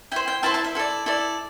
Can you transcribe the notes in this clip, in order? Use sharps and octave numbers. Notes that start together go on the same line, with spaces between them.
E4 C5 G5
G5
E4 C5 E5 A5
E5 A5
E5
E4 A4 D5
E4 A4 D5